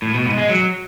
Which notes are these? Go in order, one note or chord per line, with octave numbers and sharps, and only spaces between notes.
A2
B2
G#2
G#3
F#3